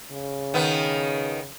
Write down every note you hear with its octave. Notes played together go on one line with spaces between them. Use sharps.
C#3
D#3 B3